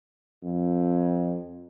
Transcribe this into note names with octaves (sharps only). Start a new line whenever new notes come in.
F2